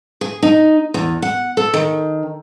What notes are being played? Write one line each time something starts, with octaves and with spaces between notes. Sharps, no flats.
G#4
D#4
E2
F#5
A4
D#3